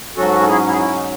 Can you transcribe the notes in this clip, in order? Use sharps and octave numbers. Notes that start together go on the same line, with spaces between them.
G#2 F#3 C#4 F#4 A4
A4
E4 G#4
E4 G#4
E4
D#4